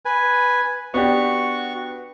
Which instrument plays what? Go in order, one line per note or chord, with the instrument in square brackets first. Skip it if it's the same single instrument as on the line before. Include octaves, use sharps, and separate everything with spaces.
[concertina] B4 G#5
[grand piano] B3 D4 G4 [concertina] F#4 C#6